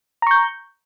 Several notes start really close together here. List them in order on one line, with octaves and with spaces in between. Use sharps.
A#5 C#6 G6